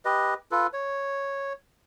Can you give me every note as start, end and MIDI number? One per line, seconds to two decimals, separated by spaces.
0.05 0.34 67
0.05 0.34 71
0.05 0.34 75
0.51 0.67 65
0.51 0.67 69
0.51 0.67 71
0.73 1.53 73